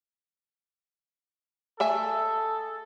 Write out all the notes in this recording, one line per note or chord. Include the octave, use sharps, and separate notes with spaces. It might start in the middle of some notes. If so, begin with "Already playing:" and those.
A3 G#4 A4 E5 G#5